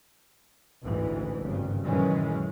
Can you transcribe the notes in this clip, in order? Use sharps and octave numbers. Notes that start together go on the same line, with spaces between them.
A1 D2 G#2 E3
G#1 G2 C#3
F#2 A#2 D#3 E3 G#3 C#4